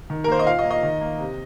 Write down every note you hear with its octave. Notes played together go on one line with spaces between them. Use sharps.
D#3
A#4
A#3 C5
D#5
A#2 F5
D#5
A#3
D#5
D#3
A#3
C3